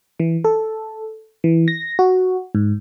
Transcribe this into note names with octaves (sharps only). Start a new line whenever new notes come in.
E3
A4
E3
A#6
F#4
G#2